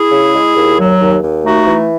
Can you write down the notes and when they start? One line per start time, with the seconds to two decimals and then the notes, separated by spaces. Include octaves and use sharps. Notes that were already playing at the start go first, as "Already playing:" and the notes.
Already playing: E4 G#4
0.12 C#3
0.34 G#3
0.57 D#2
0.79 F#3
1.01 D#2
1.22 D#2
1.44 A3 D#4 F#4
1.67 E3